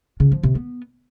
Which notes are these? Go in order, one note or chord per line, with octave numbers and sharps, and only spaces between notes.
C#3
F3
C3
B3